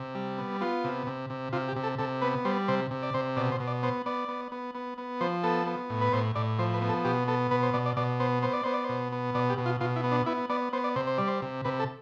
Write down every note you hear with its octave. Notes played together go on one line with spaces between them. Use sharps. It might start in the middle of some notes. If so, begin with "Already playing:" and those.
Already playing: C3
G3
B3
B3 F4
C3
C3
C3
C3 F4
G4
C3
A4
C3 A4
B3 B4
G3 C5
C3 C5
C3
D5
C3 C5
B2 D5
C5
B2
D5
B3 C5
B3 D5
B3
B3
B3
B3
F3 C5
B3 A4
B3
A2
B4
A2 C5
A2 D5
F3 C5
B4
B3
A4
B2 G4
B3 A4
B2 B4
C5
B2 D5
D5
B2 D5
B3 C5
B3 C5
D5
B3 C5
D5
B2 C5
B3
B2 D5
G4
B2
F4
B2 F4
E4
B3
D4
B3 E4
B3 D5
B3 C5
D5
C3 C5
C5
G3 D5
C5
C3
C3 B4
A4